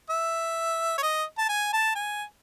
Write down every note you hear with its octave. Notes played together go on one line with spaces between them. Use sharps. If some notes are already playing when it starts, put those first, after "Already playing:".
E5
C#5
D#5
A5
G#5
A5
G#5